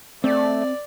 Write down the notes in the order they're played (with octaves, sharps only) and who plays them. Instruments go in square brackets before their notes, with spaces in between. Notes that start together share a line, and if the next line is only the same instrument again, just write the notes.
[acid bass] A3 [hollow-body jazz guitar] C4 [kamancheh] D5